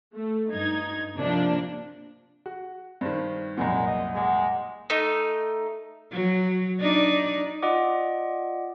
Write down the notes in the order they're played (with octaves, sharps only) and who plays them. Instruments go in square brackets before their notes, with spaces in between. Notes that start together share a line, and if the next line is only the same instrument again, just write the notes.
[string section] A3
G2 D#4 G#6
C3 F3 A#3 D4
[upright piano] F#4
[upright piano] G2 D#3 [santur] C5
[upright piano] C2 F#2 A#2 [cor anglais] G#3 [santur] B4 F#5
[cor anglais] D#5
[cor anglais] G#3 [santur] G#4 D5 F#5
[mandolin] A3 D#4
[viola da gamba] F#3
D4 D#4 D5
[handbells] F4 D5 D#5 F#5 D6